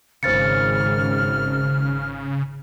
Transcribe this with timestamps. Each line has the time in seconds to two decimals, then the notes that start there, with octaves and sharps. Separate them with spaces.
0.23 G#1 C#3 C5 F6 A6 C#7